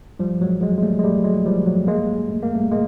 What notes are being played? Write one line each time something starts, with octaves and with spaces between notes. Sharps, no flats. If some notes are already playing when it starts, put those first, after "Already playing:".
F3 G3
F#3 G#3
F#3 G#3
G#3
G3 A3
G#3
G3 A3
F#3 G#3
F3 G3
F#3
G#3 A#3
A3
A#3
G3 A3
G#3 A#3